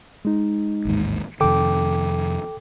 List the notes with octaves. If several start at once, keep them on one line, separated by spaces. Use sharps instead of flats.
G#3 D#4
A1 D#2 G#2
F2 C3 D#3 A4 G5 D6